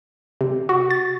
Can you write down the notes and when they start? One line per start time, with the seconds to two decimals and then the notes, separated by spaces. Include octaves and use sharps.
0.41 C3
0.69 F#4
0.90 A6